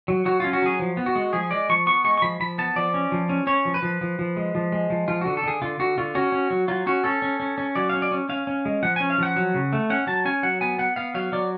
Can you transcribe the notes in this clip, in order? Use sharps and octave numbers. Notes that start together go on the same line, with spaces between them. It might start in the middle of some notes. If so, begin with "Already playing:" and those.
F#3
F#3 F#4
C#4 F4
F#4
F#3 G#4
F3
B3
F#4
G#3
F3 G#4
G#3 D5
F3 C#6
B3 C#6
G#3 C#6
C#6
F3 B5
F3 B5
B3 A5
F3 D5
C#4
F3
C#4
C#4 C#5
F3
B4
F3
F3
F3
G#3
F3
G#3
F3
F3 F4
D3 F#4
A4
D3 G#4
D3 F4
D3 F#4
D3 F4
C#4 F#4
C#4
F#3
F#3 F4
C#4 F#4
C#4 A4
C#4
C#4
C#4
F#3 D5
C#4 F5
D5
C#4
C#4 F5
C#4
G#3
F3 F#5
C#4 G#5
F5
F3 F#5
F#3
C#3
A3
C#4 F#5
F#3 A5
C#4 G#5
F#3 F#5
B3 G#5
B3 F#5
B3 F5
F#3 F5
F#3 D5